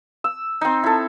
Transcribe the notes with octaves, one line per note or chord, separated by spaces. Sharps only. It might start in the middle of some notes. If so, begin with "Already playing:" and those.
E6
C4 D#4
E4 A4